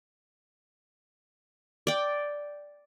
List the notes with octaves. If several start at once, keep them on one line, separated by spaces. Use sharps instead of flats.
D5 G5